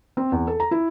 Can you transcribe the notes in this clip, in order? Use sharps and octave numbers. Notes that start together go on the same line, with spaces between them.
C4
E2
A4
A#5
E4